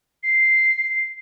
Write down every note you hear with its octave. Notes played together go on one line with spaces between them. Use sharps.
C7